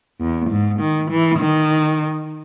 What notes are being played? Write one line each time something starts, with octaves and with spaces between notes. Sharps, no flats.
E2
G#2
D#3
E3
D#3